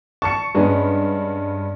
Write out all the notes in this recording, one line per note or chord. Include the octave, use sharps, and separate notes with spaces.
A5 C#6 C#7
G2 G#3 B3 C#4